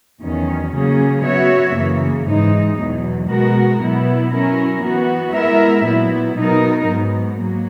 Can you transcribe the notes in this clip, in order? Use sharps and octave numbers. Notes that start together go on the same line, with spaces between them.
E2 D#3 F#3 C#4
C#3 F#3 A#3 C#4 G#4
F#3 B3 F#4 C#5 E5
F#2 C#3 E3 A#3
G#2 E3 G#3 D#4
E2 B2 F#3
B2 G#3 B3 F#4 A#4
B2 F#3 B3 E4
F#3 C#4 E4 A#4
E3 B3 F#4
G#3 B3 E4 A#4 E5
A#2 F#3 B3 E4
B2 F#3 B3 D#4 A#4
G#2 F#3 B3
F#3 A#3